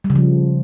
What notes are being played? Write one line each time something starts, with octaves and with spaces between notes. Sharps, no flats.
G3
C#3
F3